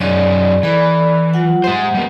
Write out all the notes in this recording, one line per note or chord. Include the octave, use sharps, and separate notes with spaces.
F#2 C#4 D#4 G#4 D5 D#5
E3 A4 D5 B5
F#3 F4 F#5
G#3 G4 C5 E5 F#5
G3 A#3